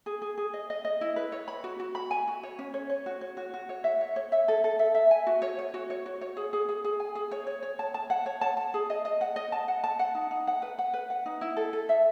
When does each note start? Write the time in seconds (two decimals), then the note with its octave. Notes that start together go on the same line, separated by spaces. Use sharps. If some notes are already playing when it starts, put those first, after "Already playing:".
0.06 G#4
0.22 G#4
0.38 G#4
0.54 D#5
0.70 D#5
0.85 D#5
1.01 E4
1.16 B4
1.32 C#5
1.48 B5
1.64 F#4
1.80 F#4
1.95 B5
2.11 G#5
2.28 F#4
2.43 C#5
2.59 C#4
2.74 C#5
2.90 C#5
3.06 F#4
3.21 C#5
3.37 F#4
3.54 F#4
3.69 C#5
3.84 E5
4.01 C#5
4.16 C#5
4.32 E5
4.48 A4
4.64 A4
4.79 E5
4.95 E5
5.11 G#5
5.27 F#4
5.42 C#5
5.59 C#5
5.74 F#4
5.90 C#5
6.06 F#4
6.21 C#5
6.37 G#4
6.53 G#4
6.69 G#4
6.84 G#4
7.00 G#5
7.15 G#4
7.31 C#5
7.47 C#5
7.63 C#5
7.79 A5
7.94 A5
8.10 F#5
8.26 C#5
8.41 A5
8.57 A5
8.74 G#4
8.90 D#5
9.05 D#5
9.21 F#5
9.36 D#5
9.52 A5
9.68 F#5
9.84 A5
9.99 F#5
10.15 D#4
10.31 D#4
10.47 F#5
10.62 B4
10.78 F#5
10.93 B4
11.10 F#5
11.26 D#4
11.41 E4
11.57 A4
11.73 A4
11.89 E5